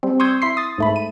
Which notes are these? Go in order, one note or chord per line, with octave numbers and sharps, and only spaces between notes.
G3 C4
C6 C#6 D#6 E6 G6 G#6
E4 C6 B6 C7
D#6 A6
G#2 A3 B5
D#7